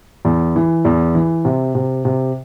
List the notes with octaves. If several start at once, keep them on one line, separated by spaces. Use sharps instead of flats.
E2
E3
E2
E3
C3
C3
C3